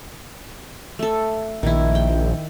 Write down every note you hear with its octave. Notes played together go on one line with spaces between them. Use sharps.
A3 A4
A#1 D#3 E4
G5